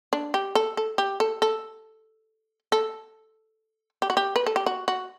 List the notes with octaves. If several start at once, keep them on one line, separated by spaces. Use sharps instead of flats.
D4
G4
A4
A4
G4
A4
A4
A4
G4
F#4
G4
B4
A4
G4
F#4
F#4